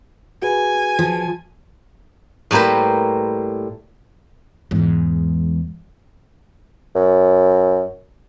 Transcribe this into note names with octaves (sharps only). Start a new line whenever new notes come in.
F#4 G#4 B4 G#5
F3
A2 G3 A#3 B4 C5
E2 G#2
F#2